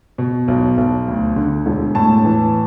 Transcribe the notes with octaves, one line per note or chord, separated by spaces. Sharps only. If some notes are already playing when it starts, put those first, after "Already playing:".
B2
B1
B1
D2
D3
E1
A2 A5
E3